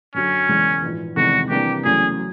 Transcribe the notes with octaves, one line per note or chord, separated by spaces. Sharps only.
F#2 D3 F#3 C#4
E1 E2 C#3 E3 G#3
A#1 G#2 E3
F1 E2 C3 D#3 G#3 F#4
C3 E3 G3 A#3 D4 G4
E2 C#3 F#3 A3 G#4
F#3